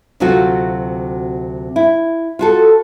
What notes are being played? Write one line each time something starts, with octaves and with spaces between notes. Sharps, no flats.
D2 C3 F#3 C4 F4 F#4
E4
F4 F#4 A4